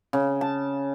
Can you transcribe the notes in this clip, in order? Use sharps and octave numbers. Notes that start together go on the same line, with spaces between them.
C#3
A5